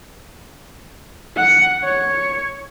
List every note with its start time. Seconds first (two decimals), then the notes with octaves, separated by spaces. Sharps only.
1.37 F#5
1.84 C#5